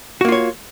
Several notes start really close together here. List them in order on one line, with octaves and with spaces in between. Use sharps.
F#4 A#3 F4 C#5